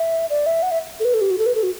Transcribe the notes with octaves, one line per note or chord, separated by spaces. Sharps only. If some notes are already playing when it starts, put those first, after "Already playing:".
Already playing: E5
D5
E5
F#5
E5
A4
B4
A4
G4
F#4
A4
B4
A4
F#4